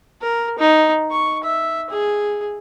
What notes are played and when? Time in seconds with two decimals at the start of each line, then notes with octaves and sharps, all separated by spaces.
0.22 A#4
0.59 D#4
1.11 C#6
1.43 E5
1.90 G#4